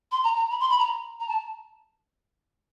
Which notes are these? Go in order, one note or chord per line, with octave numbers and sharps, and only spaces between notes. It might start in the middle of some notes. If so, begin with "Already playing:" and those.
C6
A#5
A#5
B5
C6
B5
A#5
A#5
A5